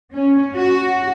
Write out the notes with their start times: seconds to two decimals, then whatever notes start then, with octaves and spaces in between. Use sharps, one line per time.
0.15 C#4
0.56 F#4